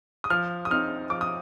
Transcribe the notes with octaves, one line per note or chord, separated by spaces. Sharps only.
D#6
F3 F6
D#6
C4 D#4 F6
F3 D6
D#6